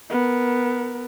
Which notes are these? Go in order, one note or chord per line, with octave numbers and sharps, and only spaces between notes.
B3 A#4